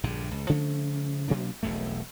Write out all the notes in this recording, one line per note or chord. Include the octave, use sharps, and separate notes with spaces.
A#1 G2 D3
C#2
C#3 F3 A3 C#4
B2 F#3 A#3 D4
E1 B1 F2 A3